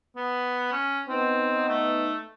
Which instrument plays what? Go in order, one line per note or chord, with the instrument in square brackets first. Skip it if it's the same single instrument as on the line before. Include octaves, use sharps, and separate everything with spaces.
[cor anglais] B3
C#4
[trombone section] B3 D#4 [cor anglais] C4
[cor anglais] A3